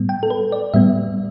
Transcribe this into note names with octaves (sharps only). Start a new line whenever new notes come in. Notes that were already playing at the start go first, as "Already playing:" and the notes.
Already playing: A2 G3 B3
G5
A4
B4
D5
A2 G3 B3 E5